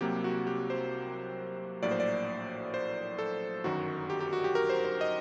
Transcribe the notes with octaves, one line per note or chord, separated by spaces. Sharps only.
C2 C3 F#3 A#3 G4
F#4
G4
C5
A#1 A2 F#3 A#3 D5
C5
D5
C5
A4
G1 F#2 D#3 F#3 F#4
G4
G4
F#4
G4
A#4
C5
C5
D#5